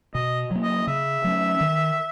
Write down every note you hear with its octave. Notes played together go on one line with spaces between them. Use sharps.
B2 D#5
F#3 A#3
D#5
C#3 E5
F#3 A3 C#4
D#3